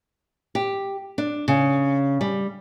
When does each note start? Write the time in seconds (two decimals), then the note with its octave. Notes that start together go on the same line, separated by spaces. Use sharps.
0.55 G4
1.18 D4
1.48 C#3
2.21 G3